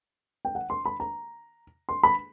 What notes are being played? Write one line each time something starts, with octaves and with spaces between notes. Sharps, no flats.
G5
F#5
C6
B5
A#5
C6
B5